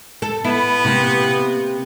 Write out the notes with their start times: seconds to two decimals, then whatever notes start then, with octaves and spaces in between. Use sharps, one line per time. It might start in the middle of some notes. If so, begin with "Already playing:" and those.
0.22 A4
0.44 B3 E4
0.85 C3 A#3